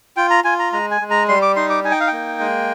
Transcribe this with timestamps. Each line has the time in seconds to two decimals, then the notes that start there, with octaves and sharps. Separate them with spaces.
0.17 F4 G5
0.30 A#5
0.44 F4 G#5
0.59 A#5
0.73 G#3 A#5
0.91 G#5
1.01 G#3
1.10 A#5
1.28 G3 C6
1.42 D6
1.56 D#4 C6
1.70 D6
1.84 D#4 G#5
1.91 G5
2.00 F5
2.07 A#3 G5
2.40 G#3